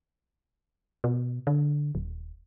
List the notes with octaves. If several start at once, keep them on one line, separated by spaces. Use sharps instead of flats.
B2
D3
D#1